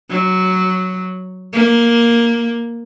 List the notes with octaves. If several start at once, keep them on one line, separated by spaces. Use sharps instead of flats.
F#3
A#3